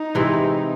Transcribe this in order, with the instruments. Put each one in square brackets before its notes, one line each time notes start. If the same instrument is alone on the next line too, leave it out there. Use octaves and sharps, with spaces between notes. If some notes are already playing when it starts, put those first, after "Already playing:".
Already playing: [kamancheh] D#4
[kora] C3 E3 G#3 C4